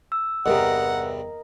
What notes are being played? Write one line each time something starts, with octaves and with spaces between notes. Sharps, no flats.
E6
E2 G2 C3 A#4 D#5 F#5